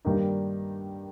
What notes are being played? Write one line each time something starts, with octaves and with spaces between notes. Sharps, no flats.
G2 D#3 G3 A#3 D#4